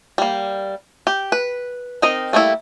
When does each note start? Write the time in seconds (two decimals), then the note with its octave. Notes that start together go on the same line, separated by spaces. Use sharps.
0.18 G3 A#3
1.07 G4
1.32 B4
2.02 C4 D#4 A#4 D#5
2.33 G3 A3 A#3 E4